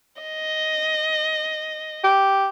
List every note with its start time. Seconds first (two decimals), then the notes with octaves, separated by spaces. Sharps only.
0.22 D#5
2.04 G4